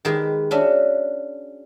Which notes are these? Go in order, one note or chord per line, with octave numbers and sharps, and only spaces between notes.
D#3 G#3 G4 G#4 B4
C#4 D4 F#4 E5